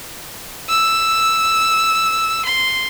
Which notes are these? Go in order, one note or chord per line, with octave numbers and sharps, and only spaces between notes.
E6
C6